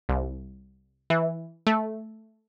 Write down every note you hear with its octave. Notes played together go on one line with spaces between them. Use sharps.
C2
E3
A3